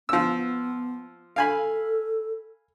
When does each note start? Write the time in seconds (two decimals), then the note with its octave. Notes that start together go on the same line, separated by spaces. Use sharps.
0.09 F3 B3 E6
1.36 A4 F5 G#5 B5